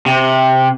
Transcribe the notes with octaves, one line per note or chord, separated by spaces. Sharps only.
C3